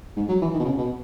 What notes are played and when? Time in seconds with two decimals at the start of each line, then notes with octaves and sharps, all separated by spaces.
0.16 G#2
0.29 F#3
0.41 E3
0.53 D#3
0.59 B2
0.65 C#3
0.77 B2